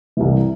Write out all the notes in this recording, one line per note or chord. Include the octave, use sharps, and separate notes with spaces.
C2 C3 E3